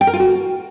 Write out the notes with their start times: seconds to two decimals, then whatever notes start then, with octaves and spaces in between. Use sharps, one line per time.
0.01 G5
0.07 A#4
0.13 F4
0.20 F#4